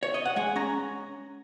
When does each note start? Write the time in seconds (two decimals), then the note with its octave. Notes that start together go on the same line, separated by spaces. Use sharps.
0.03 C#5
0.14 D#5
0.25 F#5
0.36 G#3 G#5
0.56 C#4 A#5